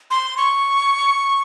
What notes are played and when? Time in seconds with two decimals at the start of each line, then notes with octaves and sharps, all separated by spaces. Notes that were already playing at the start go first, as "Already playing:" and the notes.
0.11 C6
0.37 C#6